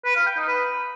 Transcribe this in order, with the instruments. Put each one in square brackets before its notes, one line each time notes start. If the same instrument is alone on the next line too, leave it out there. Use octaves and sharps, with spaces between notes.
[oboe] B4
F5
G5
D#4
B4